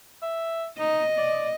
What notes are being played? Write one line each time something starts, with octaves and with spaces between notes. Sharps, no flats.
E5
D#4 D#5
D5